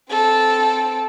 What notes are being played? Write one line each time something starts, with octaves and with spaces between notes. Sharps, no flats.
C4 A4